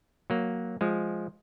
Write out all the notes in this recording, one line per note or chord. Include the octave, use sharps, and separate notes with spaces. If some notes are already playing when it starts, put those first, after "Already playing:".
F#3 A#3
F3 G#3